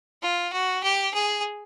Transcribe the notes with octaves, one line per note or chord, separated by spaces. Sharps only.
F4
F#4
G4
G#4